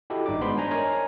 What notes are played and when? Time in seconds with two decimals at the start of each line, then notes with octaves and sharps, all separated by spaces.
0.10 E4 F#4 G4 A4 D#5
0.26 G#1 G2 D#4 D5 D6
0.41 G#3 B3 C5 B5 C6
0.56 D4 C5 G#5 A#5 C6
0.71 A#4 C#5 D#5 G#5 A#5